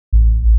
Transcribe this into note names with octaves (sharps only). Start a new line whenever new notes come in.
A1